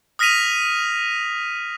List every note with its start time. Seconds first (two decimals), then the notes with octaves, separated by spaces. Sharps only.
0.19 D#6 F6 A#6 B6 D#7 F7